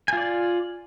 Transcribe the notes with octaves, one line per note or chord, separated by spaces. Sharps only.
F4 D5 G#5